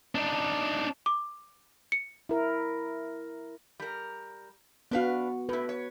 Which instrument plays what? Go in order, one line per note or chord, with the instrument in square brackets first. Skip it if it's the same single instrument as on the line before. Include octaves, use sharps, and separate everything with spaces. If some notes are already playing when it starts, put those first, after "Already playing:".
[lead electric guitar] D4 D#4
[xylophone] D6
C#7
[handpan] E4 A#4
[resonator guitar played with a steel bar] G3 A#4
[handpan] B3 F#4 [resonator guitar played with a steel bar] D4 B4 F5
[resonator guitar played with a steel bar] A2 E4 [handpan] B4
[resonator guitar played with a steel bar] C#5